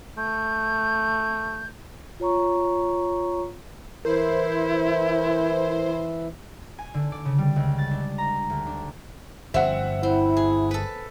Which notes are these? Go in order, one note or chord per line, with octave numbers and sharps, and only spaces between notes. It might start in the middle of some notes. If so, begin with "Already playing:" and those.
A3 G6
F4 C#5 A#5 C#6
E3 E4 A#4 C5
G#5
D3
D5
C#3
G3
C#2
A6
D4
A#5
D2
D4
G1 G2 F3 C4 E5 F#5
C4 E4
G#4
A4 B4